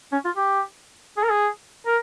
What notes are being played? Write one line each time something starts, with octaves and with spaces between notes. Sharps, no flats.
C#4
F4
G4
G#4
A#4
G#4
A#4